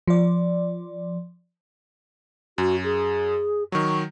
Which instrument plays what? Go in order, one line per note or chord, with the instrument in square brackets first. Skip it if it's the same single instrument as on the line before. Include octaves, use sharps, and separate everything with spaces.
[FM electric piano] F3 D5
[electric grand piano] F#2 [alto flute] F#4
[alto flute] G#4
[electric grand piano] D#3 F#3 [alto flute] C#6